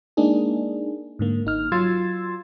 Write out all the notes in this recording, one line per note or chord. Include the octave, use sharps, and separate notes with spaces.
G#3 A#3 D4 D#4 G#4
G#2 D3 A#3
G#1 D#4 F6
F#3 F4 C6 E6 G#6 A6